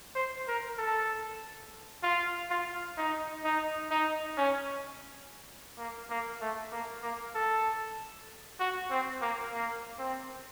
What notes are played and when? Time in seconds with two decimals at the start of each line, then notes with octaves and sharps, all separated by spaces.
0.16 C5
0.48 A#4
0.78 A4
2.03 F4
2.50 F4
2.97 D#4
3.44 D#4
3.91 D#4
4.37 C#4
5.78 A#3
6.10 A#3
6.41 A3
6.72 A#3
7.03 A#3
7.35 A4
8.60 F#4
8.90 C4
9.21 A#3
9.53 A#3
9.99 C4